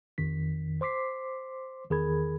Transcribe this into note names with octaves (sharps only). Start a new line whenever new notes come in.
A1 F2 D#3 B6
C5 C6 D6 B6 C7
E2 D#3 G#4 A#4 B5 G#6